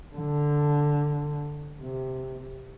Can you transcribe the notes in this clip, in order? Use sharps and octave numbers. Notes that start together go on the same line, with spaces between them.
D3
C3